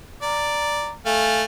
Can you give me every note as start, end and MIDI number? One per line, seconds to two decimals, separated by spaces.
0.22 0.91 74
0.22 0.90 82
1.06 1.43 57
1.06 1.43 77
1.06 1.40 80